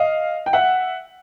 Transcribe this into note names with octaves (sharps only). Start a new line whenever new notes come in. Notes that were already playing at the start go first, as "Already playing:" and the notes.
Already playing: D#5 F5
G5
E5 F#5